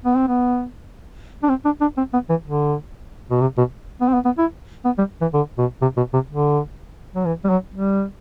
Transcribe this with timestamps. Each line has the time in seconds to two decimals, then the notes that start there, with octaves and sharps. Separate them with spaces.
0.05 B3
0.17 C4
0.28 B3
1.43 D4
1.49 C4
1.65 D4
1.81 D4
1.98 C4
2.13 B3
2.30 E3
2.45 D3
3.31 B2
3.41 C3
3.58 B2
4.01 B3
4.09 C4
4.14 B3
4.25 B3
4.38 E4
4.85 B3
4.98 G3
5.21 E3
5.34 D3
5.58 B2
5.82 C3
5.97 B2
6.14 C3
6.30 D3
7.16 F#3
7.25 E3
7.44 G3
7.50 F#3
7.74 G3